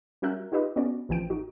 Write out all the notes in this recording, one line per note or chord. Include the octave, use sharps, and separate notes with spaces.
G3 C#4 F#4 A#4 E5 F#6
D#4 F4 G4 B4 D#5
B3 C#4 D4 F#4 D5
A1 E3 F3 G5 D7
D#4 F#4